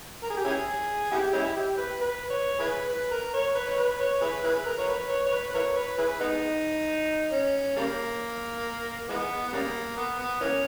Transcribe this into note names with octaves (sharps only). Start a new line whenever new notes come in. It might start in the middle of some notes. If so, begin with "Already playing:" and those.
A#4
G#4
G4
C#4 E4 G#4
B3 E4 G4
G#3 C#4 E4
G4
B4
B4
C#5
E4 G#4 B4
B4
A#4
C#5
B4
C#5
B4
C#5
E4 G#4 B4
E4 G#4 B4
A#4
C#5
B4
C#5
C#5
B4
B4
E4 A#4 C#5
B4
E4 G#4 B4
G#3 B3 D#4
C#4
C#3 G3 A#3
E3 G#3 B3
B3
C#3 G3 A#3
B3
B3
E3 A#3 C#4